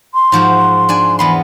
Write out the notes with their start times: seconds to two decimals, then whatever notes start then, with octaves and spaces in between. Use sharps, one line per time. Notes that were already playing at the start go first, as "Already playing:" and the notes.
0.14 C6
0.32 G#2 F3 F#4
0.89 D4 D5 G#5
1.19 E2 B3 B5 C6